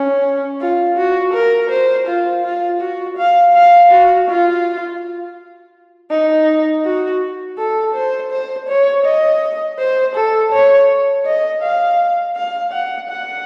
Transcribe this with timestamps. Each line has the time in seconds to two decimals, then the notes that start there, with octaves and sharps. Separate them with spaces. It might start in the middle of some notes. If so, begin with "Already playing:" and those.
Already playing: C#4
0.61 F4
0.97 F#4
1.34 A#4
1.70 C5
2.07 F4
2.44 F4
2.81 F#4
3.17 F5
3.55 F5
3.91 F#4
4.28 F4
6.11 D#4
6.85 F#4
7.58 A4
7.94 C5
8.31 C5
8.69 C#5
9.05 D#5
9.79 C5
10.16 A4
10.53 C#5
11.26 D#5
11.62 F5
12.36 F5
12.72 F#5
13.10 F#5